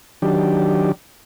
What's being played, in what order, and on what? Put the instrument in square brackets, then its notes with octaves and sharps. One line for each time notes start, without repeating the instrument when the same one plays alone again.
[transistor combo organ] D#3 F#3 D4 G4